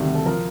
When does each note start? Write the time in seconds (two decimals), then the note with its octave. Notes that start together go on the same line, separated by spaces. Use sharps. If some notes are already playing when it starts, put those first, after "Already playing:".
Already playing: D2 C3 D#3 G3
0.15 A4
0.25 F3 A#4